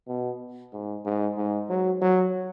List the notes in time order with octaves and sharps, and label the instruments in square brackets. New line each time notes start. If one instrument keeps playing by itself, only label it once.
[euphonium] B2
G#2
G#2
G#2
F#3
F#3